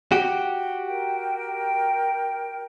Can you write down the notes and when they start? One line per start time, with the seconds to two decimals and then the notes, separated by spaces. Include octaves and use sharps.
0.12 F#4 G4
0.86 A#4 G5